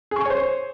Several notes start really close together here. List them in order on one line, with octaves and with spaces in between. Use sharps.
G#4 C#6 G#5 C#5 C5